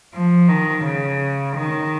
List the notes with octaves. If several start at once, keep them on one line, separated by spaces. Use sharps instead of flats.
F3
D#3
C#3
D#3